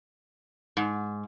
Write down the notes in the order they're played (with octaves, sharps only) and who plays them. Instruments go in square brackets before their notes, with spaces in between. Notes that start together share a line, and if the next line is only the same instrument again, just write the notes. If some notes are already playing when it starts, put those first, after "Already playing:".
[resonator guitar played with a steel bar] G#2